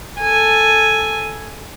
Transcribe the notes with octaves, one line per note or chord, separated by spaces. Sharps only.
A4 G#5